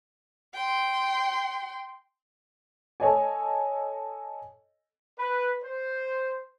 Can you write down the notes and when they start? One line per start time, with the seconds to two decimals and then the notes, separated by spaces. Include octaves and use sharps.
0.54 G5 C6
3.00 A4 C#5 D#5 G#5
5.19 B4
5.63 C5